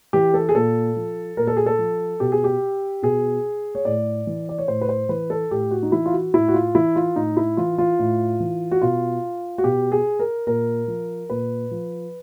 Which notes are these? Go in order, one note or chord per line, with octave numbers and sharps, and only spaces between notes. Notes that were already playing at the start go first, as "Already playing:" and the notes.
E3 G4
A4
G#4
A#2 A4
F3
A#2 A#4
A4
G#4
A4
F3
B2 G4
G#4
G4
B2 G#4
C#5
A2 D5
E3
D5
C#5
A2 C5
B4
C5
E3 B4
A4
A2 G4
F#4
D#4
E3 E4
F4
F#4
A2 E4
F#4
F4
E3 E4
F4
A2 D#4
E4
E3 F4
F4
A2
E3
F#4
B2 F4
F#4
B2 G4
G#4
A#4
A#2 A#4
F3
A#2 B4
F3